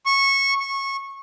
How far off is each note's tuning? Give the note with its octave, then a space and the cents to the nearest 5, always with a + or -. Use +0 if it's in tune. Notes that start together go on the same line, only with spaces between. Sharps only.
C#6 -15
C#6 -20